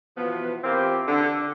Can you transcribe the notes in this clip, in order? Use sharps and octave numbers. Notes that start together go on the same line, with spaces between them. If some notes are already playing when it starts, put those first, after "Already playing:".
B2 E3 F3 B3
A#2 E3 A#3 C4 G4
D3